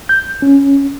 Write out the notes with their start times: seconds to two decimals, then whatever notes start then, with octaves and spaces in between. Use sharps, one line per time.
0.09 G6
0.42 C#4